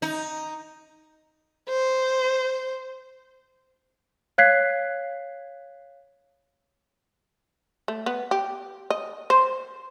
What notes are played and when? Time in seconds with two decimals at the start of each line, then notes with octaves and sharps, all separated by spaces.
0.02 D#4
1.69 C5
4.38 C#5 F5 F#6 G#6 B6 C7
7.88 A3
8.06 B3
8.31 G4
8.90 D#5
9.30 C5